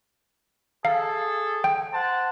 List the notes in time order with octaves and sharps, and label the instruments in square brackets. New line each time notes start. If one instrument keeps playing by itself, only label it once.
[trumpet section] G#4 A4 [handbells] F5
[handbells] G5
[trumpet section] C5 F#5 A5